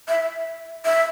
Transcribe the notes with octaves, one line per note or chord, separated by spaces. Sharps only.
E5
E5